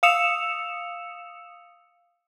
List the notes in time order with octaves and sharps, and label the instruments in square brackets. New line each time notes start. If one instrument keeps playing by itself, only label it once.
[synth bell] F5 D#6 E6 C#7 E7 F7